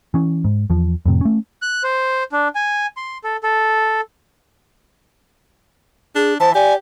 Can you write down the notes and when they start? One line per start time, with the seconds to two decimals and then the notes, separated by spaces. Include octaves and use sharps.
0.14 E3 C#4
0.44 G#2
0.70 E2 F3
1.06 F2 A2 C3
1.21 A3 C#4
1.62 F#6
1.83 C5
2.32 D4
2.55 G#5
2.97 C6
3.24 A4
3.43 A4
6.15 D4 G#4
6.40 E3 C5 A5
6.55 G4 D5 G#5